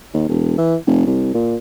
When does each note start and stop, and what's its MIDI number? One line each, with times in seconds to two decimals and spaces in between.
0.14 0.28 39
0.29 0.56 28
0.58 0.76 52
0.87 1.02 29
1.06 1.32 36
1.34 1.56 46